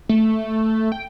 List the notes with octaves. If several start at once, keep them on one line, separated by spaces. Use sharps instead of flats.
A3
G5